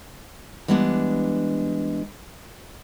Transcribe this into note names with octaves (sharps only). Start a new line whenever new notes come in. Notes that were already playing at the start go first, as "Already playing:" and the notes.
E3 G3 G#3 B3 C4 D4